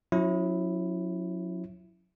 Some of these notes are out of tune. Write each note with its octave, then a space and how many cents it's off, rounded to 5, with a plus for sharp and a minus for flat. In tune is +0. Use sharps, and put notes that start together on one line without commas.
F#3 -35 C#4 +0 E4 +0